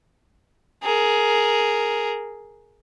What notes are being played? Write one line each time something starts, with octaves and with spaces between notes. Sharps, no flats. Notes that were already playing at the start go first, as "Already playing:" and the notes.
G#4 A#4